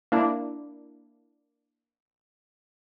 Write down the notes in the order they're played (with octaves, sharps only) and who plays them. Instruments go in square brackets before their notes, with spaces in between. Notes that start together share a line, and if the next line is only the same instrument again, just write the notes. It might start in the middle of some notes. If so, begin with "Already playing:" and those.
[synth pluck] A#3 D4 E4